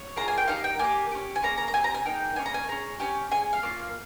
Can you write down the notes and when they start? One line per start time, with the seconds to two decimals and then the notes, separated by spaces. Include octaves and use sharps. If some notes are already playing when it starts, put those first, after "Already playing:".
Already playing: C#5
0.16 A#3 F4 G#4 A#5
0.28 G#5
0.38 G5
0.48 A#3 D#4 G4 F5
0.64 G5
0.79 A#3 D#4 G4 G#5
1.11 C#4 G4
1.36 G#5
1.42 A#3 C#4 G#4 A#5
1.58 A#5
1.68 A#5
1.74 C4 G4 G#5
1.84 A#5
1.94 G#5
2.05 A#3 D#4 G#4 G5
2.36 A#3 C#4 G#4 G#5
2.46 A#5
2.54 G#5
2.68 C#4 G#4 A#5
2.99 C#4 G4 G#5
3.31 C#4 G#4 G#5
3.53 F5
3.63 A#3 C#4 F4